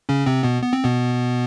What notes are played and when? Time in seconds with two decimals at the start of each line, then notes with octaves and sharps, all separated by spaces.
0.09 C#3 C#4
0.26 C3 C4
0.43 B2 B3
0.62 B3
0.73 C4
0.84 B2 B3